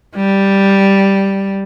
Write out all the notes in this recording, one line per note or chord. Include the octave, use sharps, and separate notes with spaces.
G3